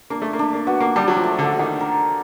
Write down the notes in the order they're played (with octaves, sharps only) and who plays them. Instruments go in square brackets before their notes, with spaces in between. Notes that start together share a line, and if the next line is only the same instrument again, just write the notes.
[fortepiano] A#3 [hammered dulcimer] D4
[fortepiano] A3
A#3
[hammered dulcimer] D4
[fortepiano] A#3
[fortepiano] B3 [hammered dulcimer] F#4
[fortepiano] A#3
[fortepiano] G3 [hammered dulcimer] D4
[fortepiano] F#3
F3
[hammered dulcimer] A3
[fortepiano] D3
[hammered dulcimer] F#4
[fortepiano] D#3
[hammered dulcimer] A#4